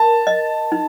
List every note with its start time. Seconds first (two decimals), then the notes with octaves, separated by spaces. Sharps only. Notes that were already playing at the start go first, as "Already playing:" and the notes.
Already playing: A#4 A5
0.27 D#5
0.72 D#4